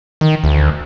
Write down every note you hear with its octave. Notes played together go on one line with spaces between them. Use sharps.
D#3
D2